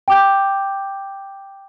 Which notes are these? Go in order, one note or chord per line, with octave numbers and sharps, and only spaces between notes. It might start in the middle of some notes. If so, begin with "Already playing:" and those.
G5 D6 G6